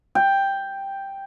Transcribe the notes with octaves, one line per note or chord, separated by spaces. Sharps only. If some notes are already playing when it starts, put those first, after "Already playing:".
G5